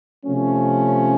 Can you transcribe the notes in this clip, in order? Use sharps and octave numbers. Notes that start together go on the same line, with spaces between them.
C3 F3 A3 C#4